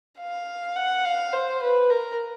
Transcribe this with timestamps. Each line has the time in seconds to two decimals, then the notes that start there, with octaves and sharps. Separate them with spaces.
0.19 F5
0.76 F#5
1.05 F5
1.33 C5
1.62 B4
1.90 A#4